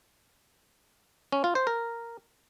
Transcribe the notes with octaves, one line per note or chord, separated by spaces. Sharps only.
C#4
F4
C5
A#4